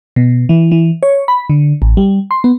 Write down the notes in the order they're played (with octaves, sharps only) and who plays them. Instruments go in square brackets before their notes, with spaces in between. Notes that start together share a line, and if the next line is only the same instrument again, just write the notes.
[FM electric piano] B2
E3
E3
C#5
B5
D3
A1
G3
C6
B3